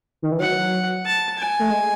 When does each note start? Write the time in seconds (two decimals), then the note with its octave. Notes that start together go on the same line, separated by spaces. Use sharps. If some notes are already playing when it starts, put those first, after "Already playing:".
0.22 D#3
0.32 E3
0.40 F#3 F#5
1.06 A5
1.38 G#5
1.59 A3
1.70 G#3